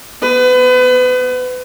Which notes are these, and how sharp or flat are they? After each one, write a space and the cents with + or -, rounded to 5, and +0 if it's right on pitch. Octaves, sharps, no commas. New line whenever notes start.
B3 +0 B4 +35